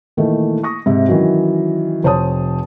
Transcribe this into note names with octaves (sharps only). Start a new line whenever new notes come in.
A#2 D#3 E3 A3
C#6 D#6 A#6
G#2 C3 E5
D#3 E3 F#3 C#4
F1 C5 C#5 A5 D#6